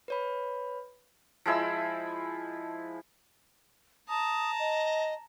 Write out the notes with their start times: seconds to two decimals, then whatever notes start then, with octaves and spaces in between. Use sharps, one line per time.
0.08 B4 C#5 B5
1.46 F3 G#3 E4 E6
4.09 A5 A#5 D#6
4.59 D#5